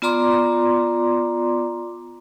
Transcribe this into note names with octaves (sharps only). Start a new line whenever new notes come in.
B3 F4 D5 A#5 C6 D6